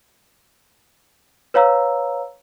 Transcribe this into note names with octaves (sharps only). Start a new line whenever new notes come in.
B4 C#5 F5 A#5 E6